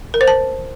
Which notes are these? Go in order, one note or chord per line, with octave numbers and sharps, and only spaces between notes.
A#4
C5
A5